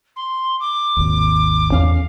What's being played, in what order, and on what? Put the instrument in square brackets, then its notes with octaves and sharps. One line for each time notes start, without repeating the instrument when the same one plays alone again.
[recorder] C6
D6
[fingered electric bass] G#1 D#2
[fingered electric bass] E2 C#4 [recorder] F5